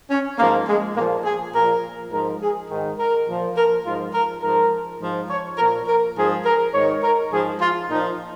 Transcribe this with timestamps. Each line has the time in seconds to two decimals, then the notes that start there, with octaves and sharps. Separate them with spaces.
0.10 C#4
0.39 G#2 F3 A#3
0.68 G#3
0.96 A#2 A#3
1.00 F3
1.25 G#4
1.54 A#2 F3 A#4
2.12 G#2 F3 A#4
2.41 G#4
2.70 G#2 D#3
2.99 A#4
3.28 A#2 F3
3.57 A#4
3.85 G#2 F3 F4
4.14 A#4
4.43 G#2 F3 A#4
5.01 G#2 F3
5.30 C#5
5.58 A#2 F3 A#4
5.87 A#4
6.16 G#2 F3 G#4
6.45 A#4
6.74 G#2 D#3 C#5
7.03 A#4
7.31 G#2 F3 G#4
7.60 F4
7.90 A#2 F3 D#4